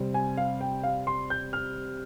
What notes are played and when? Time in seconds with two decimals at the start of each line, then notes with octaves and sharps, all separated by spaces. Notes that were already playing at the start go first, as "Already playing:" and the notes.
Already playing: C3 G3 C4
0.14 G#5
0.37 F5
0.61 G5
0.83 F5
1.07 C6
1.30 G6
1.53 F6